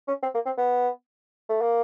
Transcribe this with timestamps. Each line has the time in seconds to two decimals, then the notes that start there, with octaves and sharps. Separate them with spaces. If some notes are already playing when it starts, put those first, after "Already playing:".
0.08 C#4
0.23 C4
0.35 A#3
0.46 C4
0.58 B3
1.49 A3
1.62 A#3